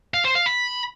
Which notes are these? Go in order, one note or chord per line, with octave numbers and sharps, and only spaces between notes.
F5
C5
F5
B5